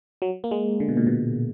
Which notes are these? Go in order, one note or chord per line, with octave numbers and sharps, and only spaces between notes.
F#3
A#3
G#3
D3
B2
A#2
B2